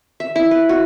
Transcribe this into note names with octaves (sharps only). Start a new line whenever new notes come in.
E5
E4
B4
F#4